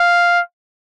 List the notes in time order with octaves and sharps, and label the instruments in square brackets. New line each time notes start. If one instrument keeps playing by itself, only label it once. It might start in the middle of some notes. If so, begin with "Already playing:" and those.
Already playing: [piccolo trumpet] F5